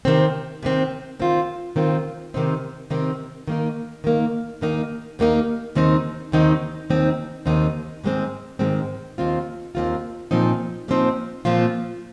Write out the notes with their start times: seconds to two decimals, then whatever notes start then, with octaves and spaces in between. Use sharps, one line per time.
0.05 C3 D#3 C4
0.62 C3 D#3 C4
1.19 D#3 C4 F4
1.76 D#3 C4 F4
2.34 C3 D#3 C4 D#4
2.90 C3 D#3 C4 D#4
3.47 D#3 A#3 D#4
4.04 D#3 A#3 D#4
4.61 D#2 D#3 A#3 D#4
5.19 D#2 D#3 A#3 D#4
5.75 D#2 D#3 C4 D#4
6.32 D#2 D#3 C4 D#4
6.90 D#2 D#3 C4 D#4
7.46 D#2 D#3 C4 D#4
8.03 G#2 D#3 G#3 C4
8.59 G#2 D#3 G#3 C4
9.18 D#2 D#3 C4 F4
9.75 D#2 D#3 C4 F4
10.31 A#2 F3 C4 D#4
10.88 A#2 F3 C4 D#4
11.45 A#2 F3 C4 F4